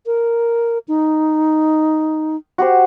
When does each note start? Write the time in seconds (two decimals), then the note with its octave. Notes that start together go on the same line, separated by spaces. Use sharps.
0.06 A#4
0.88 D#4
2.58 F#4 G4 C5